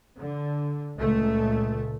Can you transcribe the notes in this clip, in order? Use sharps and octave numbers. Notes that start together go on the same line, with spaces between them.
D3
C#2 A#2 A3